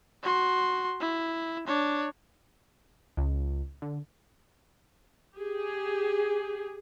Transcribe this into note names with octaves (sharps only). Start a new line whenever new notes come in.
F#4 C6
E4
D4 C#5
C#2
D3
G4 G#4